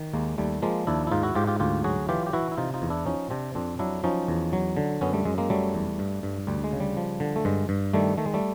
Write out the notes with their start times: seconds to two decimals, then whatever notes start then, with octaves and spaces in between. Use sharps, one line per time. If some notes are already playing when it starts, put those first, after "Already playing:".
Already playing: D#3
0.13 D#2 G#3 A#3
0.38 D#2 G3 A3
0.62 F3 G#3 A#3
0.87 D#2 D4 E4
1.07 E4
1.11 G#2 D#4 F4
1.23 E4 F#4
1.35 G#2 F4 G4
1.47 F4 G4
1.60 D2 F4 G4
1.84 F#3 F#4 G#4
2.09 E3 F4 G4
2.27 G4
2.33 E3 E4 F#4
2.52 E4
2.57 C3 D#4 F4
2.74 D#4 F4
2.82 E2
2.90 D4 E4
3.06 F3 C#4 D#4
3.30 C3 C4 D4
3.55 F2 C4 D4
3.79 F#3 D4 E4
4.04 F3 C#4 D#4
4.28 E2
4.53 F#3
4.77 D3
5.01 F#2 B3 C#4
5.13 G3 A3
5.25 F#2 G#3
5.38 G#3 A#3
5.50 F#3 G3 A3
5.74 E2
5.99 G2
6.23 G2
6.47 D2 G3
6.64 G#3
6.72 C#3
6.80 G3
6.97 F3
7.20 D3
7.36 A3
7.45 G2 G#3
7.69 G2
7.93 D#3 G3 A3
8.18 D#3 A3
8.26 G#3
8.34 G3 A3